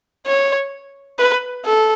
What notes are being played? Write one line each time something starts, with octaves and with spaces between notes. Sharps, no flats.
C#5
B4
A4